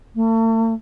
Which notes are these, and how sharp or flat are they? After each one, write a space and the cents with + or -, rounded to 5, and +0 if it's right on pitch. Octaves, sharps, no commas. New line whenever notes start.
A3 +40